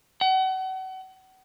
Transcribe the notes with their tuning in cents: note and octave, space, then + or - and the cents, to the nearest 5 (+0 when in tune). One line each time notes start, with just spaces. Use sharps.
F#5 +35